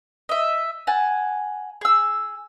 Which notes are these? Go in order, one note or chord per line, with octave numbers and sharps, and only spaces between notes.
D#5 E5
F#5 G#5 A5
G#4 E6